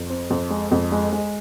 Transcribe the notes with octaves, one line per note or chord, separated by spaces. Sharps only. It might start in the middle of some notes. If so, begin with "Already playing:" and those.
Already playing: F2
C4
F2
G#3
F2
G#3
G#3